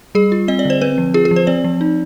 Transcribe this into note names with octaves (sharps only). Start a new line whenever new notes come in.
G3 G#4
F4
C4 D#5
D5
D3 C5
C4 B4
F3
F4 G#4
G#4
F3
C5
C4 D5
F3
D#4